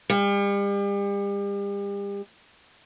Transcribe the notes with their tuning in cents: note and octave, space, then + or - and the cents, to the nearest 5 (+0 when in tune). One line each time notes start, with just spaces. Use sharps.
G3 +40